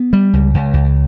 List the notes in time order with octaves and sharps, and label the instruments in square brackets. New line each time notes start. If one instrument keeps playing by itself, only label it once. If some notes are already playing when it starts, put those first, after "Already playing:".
Already playing: [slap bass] B3
G3
C#2
C#2
C#2